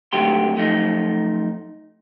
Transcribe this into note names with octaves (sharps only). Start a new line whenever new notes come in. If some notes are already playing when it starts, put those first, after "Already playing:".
D2 G#2 D3 F#3 G4 C6
F#2 F3 A3 D#4